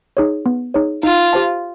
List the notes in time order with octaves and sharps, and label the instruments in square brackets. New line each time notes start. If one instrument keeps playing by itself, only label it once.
[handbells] D#4 G#4 C#5
B3
D#4 G#4 C#5
[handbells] D#4 [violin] F4
[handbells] G4 C5 F5 A5